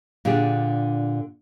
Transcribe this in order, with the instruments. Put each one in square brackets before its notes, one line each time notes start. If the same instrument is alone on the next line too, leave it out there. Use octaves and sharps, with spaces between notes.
[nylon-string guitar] A#2 D3 D4 G4 G#4